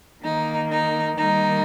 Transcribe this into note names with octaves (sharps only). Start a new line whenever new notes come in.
D#3 A#3 D#4
D#4
D#3 G3 A#3 D#4